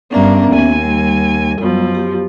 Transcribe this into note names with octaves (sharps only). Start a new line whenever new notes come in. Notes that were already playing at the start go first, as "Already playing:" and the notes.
G2 A#3 B3 C#4 D4 E5
D#2 G#5
G3
F#2 B2 F3
G4